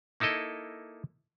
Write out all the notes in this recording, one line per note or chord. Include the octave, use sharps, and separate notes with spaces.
A#3 D#4 E4 A4 D#5